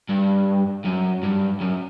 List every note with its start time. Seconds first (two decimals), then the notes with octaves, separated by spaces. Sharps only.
0.10 G2
0.85 F#2
1.23 G2
1.61 F#2